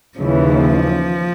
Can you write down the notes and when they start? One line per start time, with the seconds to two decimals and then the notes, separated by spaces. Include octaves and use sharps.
0.19 D#2 C#3 E3 F3